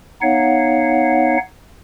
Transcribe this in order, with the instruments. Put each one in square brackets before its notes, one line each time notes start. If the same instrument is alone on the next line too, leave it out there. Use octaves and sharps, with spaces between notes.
[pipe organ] B3 D#4 C#5 F5 F#5